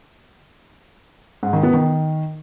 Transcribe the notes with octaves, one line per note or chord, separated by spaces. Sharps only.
G#2
D#3
B3
D#3